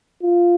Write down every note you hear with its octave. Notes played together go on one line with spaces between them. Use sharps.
F4